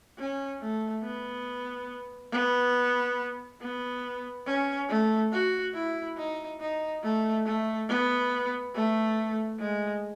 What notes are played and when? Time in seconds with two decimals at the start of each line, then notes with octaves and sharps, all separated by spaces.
0.18 C#4
0.61 A3
1.03 B3
2.32 B3
3.61 B3
4.46 C#4
4.89 A3
5.32 F#4
5.74 E4
6.17 D#4
6.60 D#4
7.03 A3
7.46 A3
7.89 B3
8.74 A3
9.59 G#3